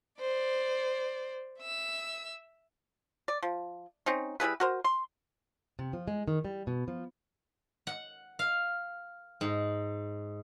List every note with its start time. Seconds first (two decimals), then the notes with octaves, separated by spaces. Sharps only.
0.20 C5 D5
1.61 E5 E6
3.28 D5
3.43 F3
4.06 C4 C#4 D#4
4.40 G3 E4 G#4 B4
4.60 F#4 A#4 C5
4.84 C6
5.79 C3
5.93 F3
6.08 G#3
6.28 D#3
6.45 G3
6.67 B2
6.88 F3
7.87 F#5
8.39 F5
9.41 G#2